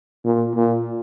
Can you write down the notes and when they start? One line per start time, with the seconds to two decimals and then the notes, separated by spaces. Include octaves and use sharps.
0.25 A#2
0.55 A#2